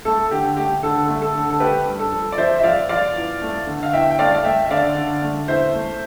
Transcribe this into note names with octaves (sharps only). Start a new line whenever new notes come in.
A3 A4
D3 G4
A3 G4
D3 A4
A3
A4
D3
A4
A3 G4 B4
G2
A4
F3
D5
F3 C5 E5
E5
F3 D5 F5
F3 D5 F5
E2
A3
D3
F5
E2 E5 G5
G5
A3 D5 F5
F5
A3 E5 G5
E5
D3 D5 F5
D3
A3
E2 C5 E5
A3